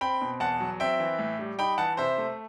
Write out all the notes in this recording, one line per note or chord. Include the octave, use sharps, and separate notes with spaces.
C4 G5 B5
B2
E2 F#5 A5
F#3
C4 E5 G5
E3
A2
G3
D#4 G5 B5
E3 F#5 A5
C3 C5 E5
A3